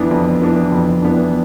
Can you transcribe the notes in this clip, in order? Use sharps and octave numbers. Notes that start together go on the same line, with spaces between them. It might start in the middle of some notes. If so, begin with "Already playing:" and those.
Already playing: F2 E3 B3 D4
F2
E3 B3 D4
F2
E3 B3 D4